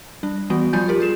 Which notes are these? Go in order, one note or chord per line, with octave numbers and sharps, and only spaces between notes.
G3 D4
E3 G3 B3 F#4
F3 G3 F4 G#5 G6
F4 G4 A#4
F4 G#4 E7